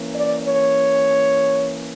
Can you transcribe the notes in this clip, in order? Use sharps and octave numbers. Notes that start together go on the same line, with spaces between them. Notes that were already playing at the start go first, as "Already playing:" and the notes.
Already playing: E3 A#3 C#4
D5
C#5